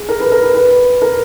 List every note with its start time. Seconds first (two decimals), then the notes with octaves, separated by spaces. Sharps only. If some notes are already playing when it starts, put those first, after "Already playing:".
Already playing: G#4
0.09 A#4
0.20 B4
0.32 A#4
0.43 B4
0.54 B4
1.02 A#4